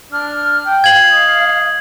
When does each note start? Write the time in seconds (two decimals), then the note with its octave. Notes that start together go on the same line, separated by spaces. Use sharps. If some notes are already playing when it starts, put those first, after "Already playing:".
0.12 D4 F6
0.66 G5
0.84 F5 G#6 F#7
1.11 D#5